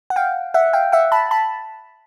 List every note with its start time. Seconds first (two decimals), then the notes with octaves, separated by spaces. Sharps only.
0.10 F#5
0.16 F5 G5
0.54 E5 F#5
0.73 F5 G5
0.92 E5 F#5
1.12 A5 B5
1.31 A5 B5